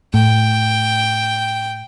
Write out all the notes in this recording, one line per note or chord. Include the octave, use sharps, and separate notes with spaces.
A2 G5